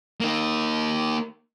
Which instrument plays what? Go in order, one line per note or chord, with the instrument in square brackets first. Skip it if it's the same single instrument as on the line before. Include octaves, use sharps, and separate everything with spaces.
[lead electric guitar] A#3 D#4